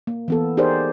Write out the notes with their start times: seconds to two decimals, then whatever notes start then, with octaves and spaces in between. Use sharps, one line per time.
0.07 A#3
0.28 E3 B3 A4
0.57 D#4 G4 G#4 A#4 C5 D5